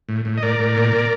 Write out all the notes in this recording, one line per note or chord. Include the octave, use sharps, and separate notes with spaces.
A2
A2
D#5
A2 A#4 D5
A2
A#2
A#2